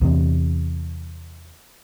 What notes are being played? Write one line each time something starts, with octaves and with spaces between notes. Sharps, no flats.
E2 C3